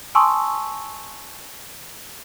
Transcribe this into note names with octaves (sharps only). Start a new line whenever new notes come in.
G#5 A5 C6 C#6 D#6 E6